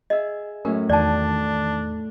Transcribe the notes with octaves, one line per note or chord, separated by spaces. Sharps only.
G#4 D#5 E5
F#2 A2 C#4 A#4
E2 D#3 D4 D5 G5 A5